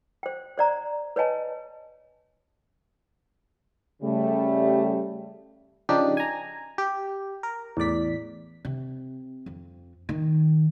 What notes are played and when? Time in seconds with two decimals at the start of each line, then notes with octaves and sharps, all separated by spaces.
0.23 C5 G5
0.58 C5 D5 A#5
1.16 B4 C#5 D#5 G#5 A5
4.02 C#3 G3 A3
5.89 C#3 F3 D4 D#4 G4
6.17 G#5 A#5
6.78 G4
7.43 A#4
7.77 E2 A2 D5 B6
8.65 C3
9.46 F2
10.09 D#3